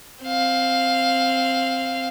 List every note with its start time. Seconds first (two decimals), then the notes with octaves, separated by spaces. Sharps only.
0.23 C4 F5